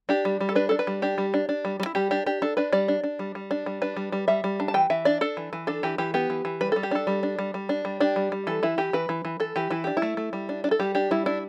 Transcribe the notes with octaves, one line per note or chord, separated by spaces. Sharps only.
D4 G4
G3
G3
A4
D4 B4
D4 A4
B4
G3
D4 G4
G3
D4
D4
G3
G3
E4
G3 G4
D4 G4
D4 G4
D4 A4
D4 B4
G3 D5
D4
D4
G3
G3
D4
G3
D4 B4
G3
G3
G3 E5
G3
D4
A5
E3 G5
E3 E5
D4 D5
D4 A4
E3
E3
D4 A4
E3 G4
E3 G4
B3 G4
E3
E3
G3 B4
G3 A4
G4
D4 A4
G3
D4
G3
G3
D4
G3
D4 G4
G3
G3
E3 A4
E3 E4
E3 G4
E3 B4
E3
E3
E3 A4
E3 G4
E3 E4
D4 G4
E4
A3
A3
G3
D4
D4
A4
G3 G4
D4 G4
G3 E4
D4 E4